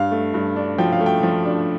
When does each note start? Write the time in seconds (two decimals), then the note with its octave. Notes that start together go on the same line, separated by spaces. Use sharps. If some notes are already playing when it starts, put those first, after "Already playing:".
Already playing: G2 F5
0.12 A3
0.34 G2
0.56 D4
0.78 F3 G5
0.92 F5
1.01 A3
1.06 G5
1.23 F3
1.45 D4